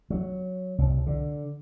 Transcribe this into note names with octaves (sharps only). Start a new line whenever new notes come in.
F#3
C2
D3